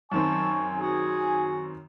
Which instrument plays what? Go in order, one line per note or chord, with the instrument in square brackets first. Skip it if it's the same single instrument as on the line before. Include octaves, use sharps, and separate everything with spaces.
[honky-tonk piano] F#2 D#3 C4 [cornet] G#5 [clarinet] A5 [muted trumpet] C#6
[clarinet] F#4 [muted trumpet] G#4